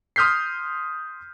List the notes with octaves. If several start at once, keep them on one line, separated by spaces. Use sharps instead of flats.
C6 D#6 F6 G6 B6 C7